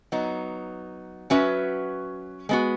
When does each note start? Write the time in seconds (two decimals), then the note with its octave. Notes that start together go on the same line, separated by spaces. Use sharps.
0.12 F#3 B3 D#4
1.30 F#3 C#4 F#4 B4 E5
2.49 G#3 B3 F#4